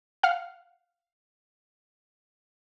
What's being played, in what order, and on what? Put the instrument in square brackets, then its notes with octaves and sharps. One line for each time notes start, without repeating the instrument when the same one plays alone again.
[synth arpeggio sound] F5 F#5 F6